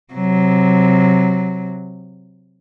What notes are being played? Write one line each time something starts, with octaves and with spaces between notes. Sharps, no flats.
C3 F#3